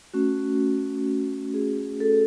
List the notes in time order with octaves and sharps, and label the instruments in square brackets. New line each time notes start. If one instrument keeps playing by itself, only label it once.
[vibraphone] A3 C#4 F#4
G#4
A4